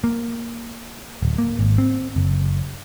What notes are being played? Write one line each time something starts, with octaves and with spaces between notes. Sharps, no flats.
A#3
D1
A#3
G#1
C4
F#1